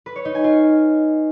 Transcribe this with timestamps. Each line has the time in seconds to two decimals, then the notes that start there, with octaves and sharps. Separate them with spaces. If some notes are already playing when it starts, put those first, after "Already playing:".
0.06 B4
0.16 C#5
0.25 D#4
0.35 G#5
0.44 F4